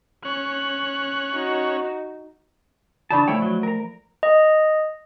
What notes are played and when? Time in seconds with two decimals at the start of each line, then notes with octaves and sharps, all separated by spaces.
0.25 C#4 C#5 F#6
1.34 D#4 F#4
3.11 C#3 E3 D4 F4 D5 A5 B5
3.28 F3 A3 E4 C#5 G5
3.42 F#3
3.63 A#4 A#5
4.23 D#5